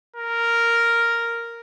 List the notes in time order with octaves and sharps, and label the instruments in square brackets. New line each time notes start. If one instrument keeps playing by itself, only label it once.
[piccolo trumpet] A#4